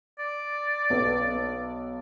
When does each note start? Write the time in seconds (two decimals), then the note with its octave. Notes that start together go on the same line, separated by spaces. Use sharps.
0.19 D5
0.90 B1 B4